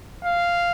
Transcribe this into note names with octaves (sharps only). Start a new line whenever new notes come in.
F5